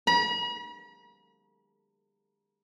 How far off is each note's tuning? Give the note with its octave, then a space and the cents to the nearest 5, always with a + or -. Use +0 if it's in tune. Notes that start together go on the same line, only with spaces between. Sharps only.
B5 -45